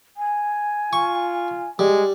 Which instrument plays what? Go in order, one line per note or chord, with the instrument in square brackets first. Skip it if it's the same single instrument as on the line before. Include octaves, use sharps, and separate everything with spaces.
[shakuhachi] G#5
[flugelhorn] F4 [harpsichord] C#6
[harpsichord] G3 [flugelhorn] G#3